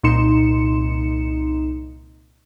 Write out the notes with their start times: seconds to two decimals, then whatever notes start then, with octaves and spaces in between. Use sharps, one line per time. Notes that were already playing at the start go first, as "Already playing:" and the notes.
0.03 C2 A#2 D#4 C6 C#7 E7